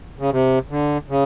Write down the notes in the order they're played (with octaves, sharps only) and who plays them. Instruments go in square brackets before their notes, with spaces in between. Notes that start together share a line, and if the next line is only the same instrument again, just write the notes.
[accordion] C#3
C3
D3
C#3